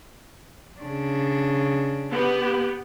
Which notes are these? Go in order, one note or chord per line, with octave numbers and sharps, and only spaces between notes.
C#3 D4
B3 G4